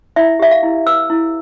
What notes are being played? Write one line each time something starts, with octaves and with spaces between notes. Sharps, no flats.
E4 E5
G4 E5
F5
E4
B4 E6
E4